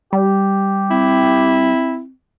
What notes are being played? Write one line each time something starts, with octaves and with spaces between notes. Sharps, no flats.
G3 G4
C4 E4